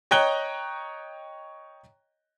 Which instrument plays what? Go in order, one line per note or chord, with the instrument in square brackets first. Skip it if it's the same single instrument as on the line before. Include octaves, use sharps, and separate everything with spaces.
[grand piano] C#5 D#5 G5 A#5 F#6 G7